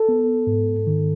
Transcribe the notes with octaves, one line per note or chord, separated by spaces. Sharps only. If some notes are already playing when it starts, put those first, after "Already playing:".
Already playing: A4
B3
G#2
D#3